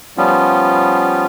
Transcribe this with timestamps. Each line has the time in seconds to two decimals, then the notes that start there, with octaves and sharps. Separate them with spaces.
0.17 F3 G3 B3 C#4 F4